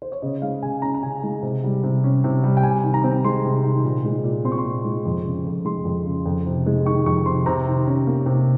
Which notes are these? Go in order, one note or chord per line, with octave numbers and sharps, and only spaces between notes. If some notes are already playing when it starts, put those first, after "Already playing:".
C5
C#5
C#3 D#5
G#3 F5
C#3 G#5
C#4 A#5
A#5
C#3 G#5
G#3
C3
G3
C3
C#4
C3
G3
G5
C3 G#5
D#3
A#5
C4
G#3 C6
C3
D#3
A#2
G#3
A#2
C4 C6
C#6
C6
A#2
G#3
F2
C#3
F2
G#3 C6
F2
C#3
F2
C3
G#3
D#3 C#6
F2 C#6
C3 C6
C3 A#5
D#3
C#4
A#3
C3